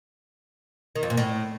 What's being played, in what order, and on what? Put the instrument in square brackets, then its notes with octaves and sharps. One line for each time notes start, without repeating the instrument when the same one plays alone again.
[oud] D#3
F2
A#2
A2